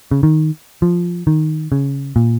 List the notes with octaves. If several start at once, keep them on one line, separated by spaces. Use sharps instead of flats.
C#3
D#3
F3
D#3
C#3
A#2